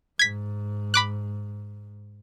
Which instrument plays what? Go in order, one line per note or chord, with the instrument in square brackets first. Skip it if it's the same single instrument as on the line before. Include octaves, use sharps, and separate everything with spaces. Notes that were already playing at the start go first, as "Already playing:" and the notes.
[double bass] G#2 [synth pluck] G#6 B6
[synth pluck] B5 D6 F#6